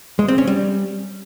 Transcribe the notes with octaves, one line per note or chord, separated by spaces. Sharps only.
G#3
C4
C#4
G3